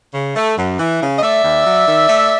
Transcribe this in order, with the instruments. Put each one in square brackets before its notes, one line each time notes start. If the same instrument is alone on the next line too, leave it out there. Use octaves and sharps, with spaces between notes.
[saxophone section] C#3
A3
F#2
E3
C#3
D#5
A3 D5 E5
D#2
F#3
D#3
A3